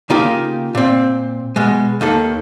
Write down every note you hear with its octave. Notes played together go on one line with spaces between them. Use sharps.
C#3 A#3 D#4 F4 G4
A#2 C4
B2 G#3
D#2 D#3 A4